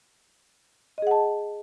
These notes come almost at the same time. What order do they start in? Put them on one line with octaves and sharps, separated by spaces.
D#5 G#4 F#5 A5